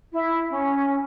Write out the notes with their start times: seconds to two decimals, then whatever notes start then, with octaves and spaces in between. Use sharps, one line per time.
0.13 E4
0.50 C#4